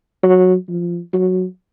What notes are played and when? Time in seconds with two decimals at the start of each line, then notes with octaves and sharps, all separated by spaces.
0.23 F#3
0.68 F3
1.13 F#3